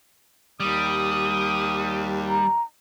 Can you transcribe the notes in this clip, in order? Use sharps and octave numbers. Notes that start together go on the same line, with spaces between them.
D#2 G3 D#6
A#5